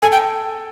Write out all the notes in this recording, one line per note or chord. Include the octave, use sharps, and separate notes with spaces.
A4 G#5
G5